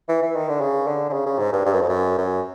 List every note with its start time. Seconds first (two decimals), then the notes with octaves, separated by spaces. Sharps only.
0.09 E3
0.22 E3
0.35 D#3
0.49 D3
0.61 C#3
0.87 D3
1.09 D3
1.13 C#3
1.26 C#3
1.39 G#2
1.53 G2
1.65 G2
1.73 F#2
1.81 F2
1.89 F#2
2.18 F#2